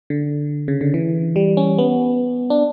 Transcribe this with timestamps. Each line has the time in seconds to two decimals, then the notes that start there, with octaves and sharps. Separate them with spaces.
0.10 D3
0.68 C#3
0.81 D3
0.94 E3
1.36 G3
1.57 C#4
1.78 B3
2.50 D4